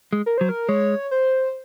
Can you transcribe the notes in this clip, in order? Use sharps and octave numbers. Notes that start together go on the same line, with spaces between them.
G#3
A#4
F#3 C5
A#4
G#3 C#5
C5